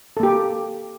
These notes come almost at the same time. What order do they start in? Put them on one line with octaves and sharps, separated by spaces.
A4 A#3 G4